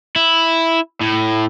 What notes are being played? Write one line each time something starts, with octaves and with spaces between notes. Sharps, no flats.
E4
A2